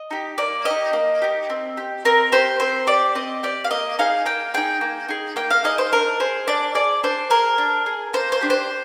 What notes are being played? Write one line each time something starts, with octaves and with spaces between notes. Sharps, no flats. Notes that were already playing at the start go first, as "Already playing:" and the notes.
Already playing: D#5
D#4 G4
A#3 D5
D#4 G4 D#5
A#3
D#4 G4
C4
G4
C4 A#4
G4 C5
C4 C5
G4 D5
C4 D#5
G4 D5
F5
A#3 D#5
D#4 G#4 F5
A#3 G5
D#4 G#4 G5
A#3
D#4 G#4
A#3 G5
F5
D#4 G#4 D#5
C5
D4 A#4
G#4 C5
D4 D5
G#4 D5
D4 C5
G#4 A#4
D4
G#4
A#3 C5
C5
D4 G4
C5